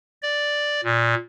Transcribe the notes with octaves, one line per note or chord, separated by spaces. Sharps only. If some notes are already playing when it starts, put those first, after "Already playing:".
D5
A#2